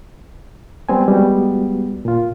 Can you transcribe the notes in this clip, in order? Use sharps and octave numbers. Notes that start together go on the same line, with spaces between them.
G3 B3 C4 G#5
G3 G#3 B3 F#4
A#2 F4